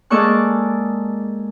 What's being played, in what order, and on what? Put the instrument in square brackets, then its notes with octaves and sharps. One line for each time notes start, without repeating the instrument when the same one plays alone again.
[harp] G#3 A#3 A4 D5 C#6 F#6